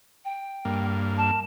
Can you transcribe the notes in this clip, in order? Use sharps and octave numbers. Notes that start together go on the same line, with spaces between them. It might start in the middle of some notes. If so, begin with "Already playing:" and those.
G5
G2 A#3
A5